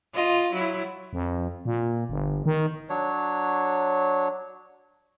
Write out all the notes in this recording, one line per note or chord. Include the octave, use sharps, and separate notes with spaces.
F4 D#5
F#3 E4
F2
A#2
G1
D#3
F#3 D4 C#5